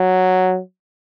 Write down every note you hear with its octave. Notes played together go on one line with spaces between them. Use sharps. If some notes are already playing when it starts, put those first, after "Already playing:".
Already playing: F#3